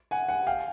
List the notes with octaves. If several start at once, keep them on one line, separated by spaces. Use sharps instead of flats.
F#5 G#5
F#5 G#5
F5 G5